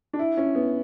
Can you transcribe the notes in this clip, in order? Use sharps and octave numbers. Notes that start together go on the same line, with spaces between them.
D4
E4
C#4
B3